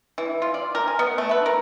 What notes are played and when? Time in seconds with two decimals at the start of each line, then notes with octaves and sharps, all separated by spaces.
0.18 E3
0.42 F4
0.54 D5
0.75 A#4
0.88 G#5
0.99 B3
1.18 A3
1.31 B4
1.46 A#4